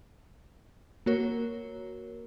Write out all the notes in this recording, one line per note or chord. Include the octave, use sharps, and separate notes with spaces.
A#3 F#4 A#4 C#5